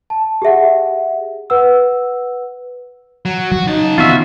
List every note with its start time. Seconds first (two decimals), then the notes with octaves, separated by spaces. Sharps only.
0.10 A5
0.42 G4 G#4 E5 F#5
1.50 B4 F#5 E6
3.25 F#3
3.51 F#3 F#4
3.67 C#3 D#4 A5
3.98 D#3 B3 C4 F4 F#4 E5